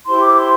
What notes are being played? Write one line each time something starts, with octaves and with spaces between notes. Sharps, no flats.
E4 G4 C5 C6
D6
C6